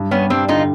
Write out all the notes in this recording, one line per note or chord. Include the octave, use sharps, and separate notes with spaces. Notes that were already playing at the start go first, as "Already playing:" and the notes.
Already playing: G2
G3 B3 C#4
G3 C4 D4
D3 D#4 F4